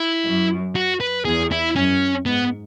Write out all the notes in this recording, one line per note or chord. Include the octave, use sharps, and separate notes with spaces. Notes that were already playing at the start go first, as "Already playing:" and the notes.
Already playing: E4
F#2
F#4
B4
E2 G#4
E4
F#2 C#4
G#2 B3